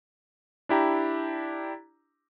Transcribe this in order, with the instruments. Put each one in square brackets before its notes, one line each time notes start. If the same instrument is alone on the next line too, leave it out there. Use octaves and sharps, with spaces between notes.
[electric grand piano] D4 E4 G4 A#5